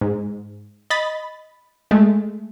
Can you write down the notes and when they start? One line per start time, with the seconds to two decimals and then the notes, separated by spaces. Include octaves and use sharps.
0.01 G#2
0.90 D#5 B5 A6
1.91 G#3 A3